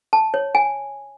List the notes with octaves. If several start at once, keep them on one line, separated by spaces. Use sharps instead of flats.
A5
C#5
G#5